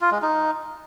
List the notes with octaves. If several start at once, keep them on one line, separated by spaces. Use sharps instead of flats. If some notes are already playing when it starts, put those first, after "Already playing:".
F4
G#3
D#4